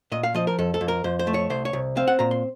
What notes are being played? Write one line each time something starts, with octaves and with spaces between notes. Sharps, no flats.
A#2 D#5
F5
F3 D#5
A#4
F2 A4
A4
F2
A#4
F2 C5
C5
A3
C#5
C2 C5
C#5
C2
C4 F5
F#5
A#2 A#5
C6